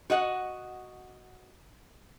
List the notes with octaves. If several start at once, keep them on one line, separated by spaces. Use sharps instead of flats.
F#4 D#5 F#5